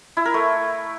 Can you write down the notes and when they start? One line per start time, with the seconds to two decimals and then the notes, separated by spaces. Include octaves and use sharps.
0.17 E4
0.25 A#4
0.34 A3